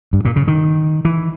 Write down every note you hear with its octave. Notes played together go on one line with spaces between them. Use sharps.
G2
A#2
C#3
D#3
E3